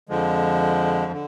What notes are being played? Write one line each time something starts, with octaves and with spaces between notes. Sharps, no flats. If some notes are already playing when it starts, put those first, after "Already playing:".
F2 D3 F3 G#3
D3